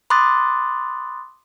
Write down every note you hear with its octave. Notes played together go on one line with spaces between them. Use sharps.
B5 C6 D6 D#6 F#6 A6